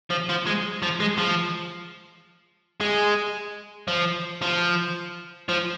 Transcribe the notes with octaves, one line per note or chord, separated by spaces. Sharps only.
F3
F3
G#3
F3
G#3
F3
G#3
F3
F3
F3